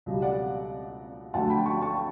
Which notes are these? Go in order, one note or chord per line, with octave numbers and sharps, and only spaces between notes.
C#2 B2 G3
D5 F#5
D2 D3 F#3 A3 F#5 A5
G5 B5
A5 C#6
A5 C#6